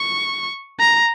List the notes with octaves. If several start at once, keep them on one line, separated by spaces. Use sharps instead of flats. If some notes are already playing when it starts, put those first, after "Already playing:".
Already playing: C#6
A#5